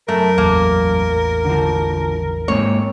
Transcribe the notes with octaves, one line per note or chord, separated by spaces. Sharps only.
F#2 A3 A#4
A1 E2 A#3
D3 F3
G#2 A#3 C4 C#5